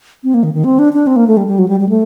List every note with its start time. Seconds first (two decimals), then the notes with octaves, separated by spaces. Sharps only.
0.24 C4
0.34 A#3
0.43 D#3
0.54 D#3
0.64 C4
0.79 D4
0.93 D4
1.07 C4
1.16 A#3
1.28 A3
1.37 G3
1.48 G3
1.59 F#3
1.68 G3
1.80 G3
1.89 A3